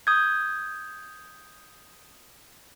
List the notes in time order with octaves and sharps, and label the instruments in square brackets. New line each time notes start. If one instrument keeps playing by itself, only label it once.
[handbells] D#6 G6 G#6